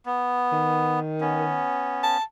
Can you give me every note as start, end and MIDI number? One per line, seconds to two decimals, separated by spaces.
0.06 1.00 59
0.52 1.65 51
1.21 2.17 59
1.21 2.17 61
2.03 2.24 81